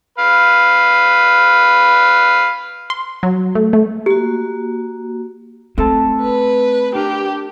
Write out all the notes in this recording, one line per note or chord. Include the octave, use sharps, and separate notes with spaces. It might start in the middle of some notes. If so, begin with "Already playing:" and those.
B4 F5
C6
F#3
A3
A3
A#3 F#4 G4
A3 C4 A4 A5
B4
D4 G4 A#4